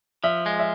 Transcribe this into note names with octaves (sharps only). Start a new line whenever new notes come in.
F3 E5
G#3
E5